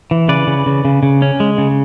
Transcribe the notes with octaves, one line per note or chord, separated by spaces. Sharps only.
E3
C#3 B4 D5
C#3
C#3
C#3
C#3
C#4
G#3
C#3